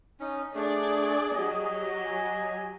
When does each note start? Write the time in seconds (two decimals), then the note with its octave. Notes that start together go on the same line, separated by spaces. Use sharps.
0.20 C#4 D#4
0.55 A3 D4 G#4 D5
1.34 F#3 G4 D#5
2.05 G#5